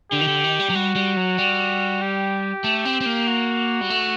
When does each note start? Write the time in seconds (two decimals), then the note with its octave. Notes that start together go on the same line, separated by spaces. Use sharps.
0.12 D3 G4
0.21 D#3
0.28 D3
0.44 D#3
0.59 G3
0.70 F#3
0.75 G3 F#4
0.96 G3
1.17 F#3
1.38 G3
2.02 G4
2.64 A3
2.85 C4
3.01 C4
3.06 A#3
3.27 F#4
3.81 G3
3.90 A3